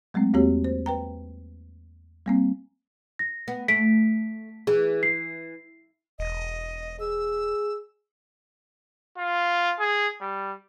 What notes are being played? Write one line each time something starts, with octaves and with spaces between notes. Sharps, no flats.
F#3 G#3 A3 C4
E2 A#3 C4 F#4 G4 C#5
C5
B4 G5 A#5
G3 A#3 C4
A#6
B3
A3 B6 D7
E3 G#4
C7
E1 D#5
G#4 E6
F4
G#4
G3